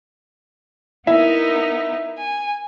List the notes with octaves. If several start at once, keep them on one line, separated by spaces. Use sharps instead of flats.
B3 D#4 E4 A#4
G#5